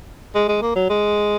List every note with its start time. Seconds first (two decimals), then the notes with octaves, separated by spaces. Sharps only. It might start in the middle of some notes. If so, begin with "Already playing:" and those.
0.35 G#3
0.48 G#3
0.62 A#3
0.76 F#3
0.90 G#3